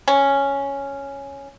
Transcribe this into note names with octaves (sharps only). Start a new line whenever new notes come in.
C#4